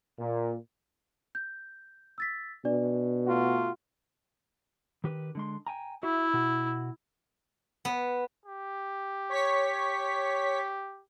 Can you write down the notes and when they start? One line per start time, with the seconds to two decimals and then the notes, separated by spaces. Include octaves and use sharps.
0.19 A#2
1.35 G6
2.18 E6 A6 B6
2.65 B2 D4 D5
3.27 A3 F4 F#4
5.04 D#3 G4 B4
5.35 D3 G#3 C6
5.67 G5 G#5 A#5
6.03 E4 F#4 E5
6.33 B2 F#4
7.85 B3
8.45 G4
9.29 C#5 C#6 B6